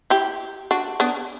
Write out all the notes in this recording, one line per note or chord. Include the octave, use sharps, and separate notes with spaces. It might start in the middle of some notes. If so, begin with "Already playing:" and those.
E4 G4
D4 F#4
B3 D4